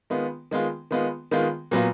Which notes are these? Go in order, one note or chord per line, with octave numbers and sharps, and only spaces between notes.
D#3 G#3 B3 F4
D#3 G#3 B3 F4
D#3 G#3 B3 F4
D#3 G#3 B3 F4
A#2 F#3 B3 F4